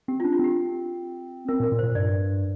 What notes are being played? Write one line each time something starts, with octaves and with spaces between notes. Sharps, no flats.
C4 G4
F4
D4
F4
C4 G4
C4 A#4
A#2
A#4
A#2
C5
A#2
G2 D5